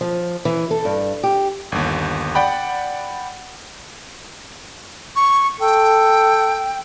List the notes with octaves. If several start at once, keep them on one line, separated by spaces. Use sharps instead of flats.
F3
E3
A4
G2
G4
G1 D#2
D5 F#5 G5 B5
C#6
A4 G5